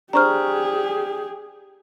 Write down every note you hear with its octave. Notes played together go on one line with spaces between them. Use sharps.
D4 G4 G#4 C5 A#5 C#6 F6